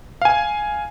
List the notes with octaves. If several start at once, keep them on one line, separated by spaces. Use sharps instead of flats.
F5 G#5